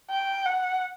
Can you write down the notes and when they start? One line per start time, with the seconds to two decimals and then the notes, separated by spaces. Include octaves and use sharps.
0.10 G5
0.45 F#5